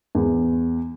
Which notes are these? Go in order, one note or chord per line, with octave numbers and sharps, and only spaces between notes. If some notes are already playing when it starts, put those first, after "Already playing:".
E2